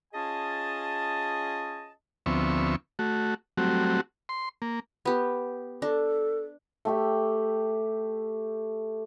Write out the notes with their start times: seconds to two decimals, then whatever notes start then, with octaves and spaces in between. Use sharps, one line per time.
0.14 C#4 F4 G#4 D#5 G#5 A5
2.26 D2 F3 B3 C4 E5 C#6
2.99 A3 F#4
3.57 F#3 G3 A3 C4 F#4
4.29 C6
4.62 A#3
5.05 B3 G4
5.82 D4 A4
6.85 A3 G4 E5